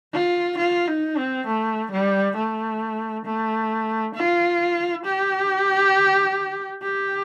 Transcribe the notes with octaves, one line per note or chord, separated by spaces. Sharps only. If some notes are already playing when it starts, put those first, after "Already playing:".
F4
F4
D#4
C4
A3
G3
A3
A3
F4
G4
G4